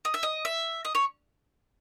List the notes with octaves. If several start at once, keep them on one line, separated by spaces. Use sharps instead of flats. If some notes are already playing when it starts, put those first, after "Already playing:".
D#5
E5
D#5
E5
D#5
C#5